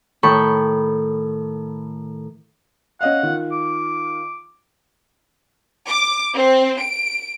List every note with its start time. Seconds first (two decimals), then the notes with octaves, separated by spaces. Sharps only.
0.23 A2 D#3 A4 G5 B5 C#6
3.01 C#4 D#5 F5 F#5
3.23 D#3 F4
3.52 D6
5.88 D6
6.35 C4
6.81 D7